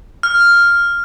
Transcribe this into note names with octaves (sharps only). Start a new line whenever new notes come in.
F6